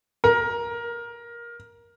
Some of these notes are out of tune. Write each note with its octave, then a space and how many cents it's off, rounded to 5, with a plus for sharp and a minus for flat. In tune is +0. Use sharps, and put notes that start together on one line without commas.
A#4 +15